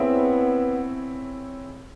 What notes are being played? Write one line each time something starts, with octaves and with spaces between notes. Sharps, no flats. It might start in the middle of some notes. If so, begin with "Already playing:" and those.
Already playing: B3 C4 E4 G#4 C#5 E5